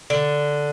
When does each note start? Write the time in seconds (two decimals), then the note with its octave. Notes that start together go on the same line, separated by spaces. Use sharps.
0.10 D3